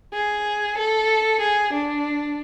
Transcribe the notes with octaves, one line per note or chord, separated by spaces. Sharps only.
G#4
A4
G#4
D4